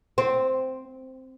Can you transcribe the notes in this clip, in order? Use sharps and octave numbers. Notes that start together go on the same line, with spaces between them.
C4